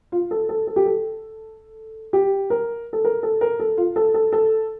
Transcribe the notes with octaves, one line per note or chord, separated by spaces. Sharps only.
F4
A4
A4
A4
G4
A4
G4
A#4
A4
A#4
A4
A#4
A4
F4
A4
A4
A4